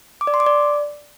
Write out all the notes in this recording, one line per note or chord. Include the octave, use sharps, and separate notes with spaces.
D6
D5
C6
D6
D5